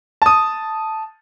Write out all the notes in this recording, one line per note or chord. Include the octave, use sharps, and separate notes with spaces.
A5 D#6